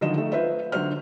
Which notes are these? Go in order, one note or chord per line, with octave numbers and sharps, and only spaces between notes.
D3 D#3 F3 F#3 D#5 E7
A3
F4 B4 C5 E5
D3 F#3 F#4 C5 F6